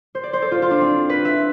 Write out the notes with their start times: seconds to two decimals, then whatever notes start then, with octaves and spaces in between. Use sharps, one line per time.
0.15 C5
0.23 D5
0.33 C5
0.42 A4
0.51 F4
0.62 F4
0.71 D4
0.81 C4
1.09 B4
1.25 E5